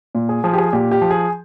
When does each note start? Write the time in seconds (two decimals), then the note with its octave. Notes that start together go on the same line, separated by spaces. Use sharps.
0.15 A#2
0.29 G#4
0.44 F3 G#4
0.53 G4
0.58 G#4
0.73 A#2 G4
0.91 G4
1.01 F3
1.11 G#4